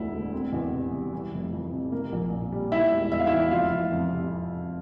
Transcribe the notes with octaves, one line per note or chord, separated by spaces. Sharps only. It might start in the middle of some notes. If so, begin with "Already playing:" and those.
Already playing: E1 D2 A3 E4
D3
C4
E2
C3
G3
E3
F1
F2
C3
A#3
A#1
A#2
G3
G3 E4 E5
E1
E2 E5
F5
E3 E4 E5
F1 F4 F5
F1
F2
C3